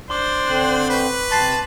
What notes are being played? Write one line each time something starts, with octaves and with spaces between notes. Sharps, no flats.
D4 C5 C6 D6
D3 C4 F#6 F#7
B4 C#6 B6
C3 G3 A5 C6 A6 C7